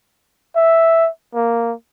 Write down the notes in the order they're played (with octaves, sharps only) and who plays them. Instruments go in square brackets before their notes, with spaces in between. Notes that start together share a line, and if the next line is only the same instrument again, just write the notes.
[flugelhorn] E5
A#3